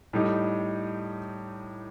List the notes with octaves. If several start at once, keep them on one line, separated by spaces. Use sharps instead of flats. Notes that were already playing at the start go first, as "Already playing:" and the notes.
A2 G3 D#4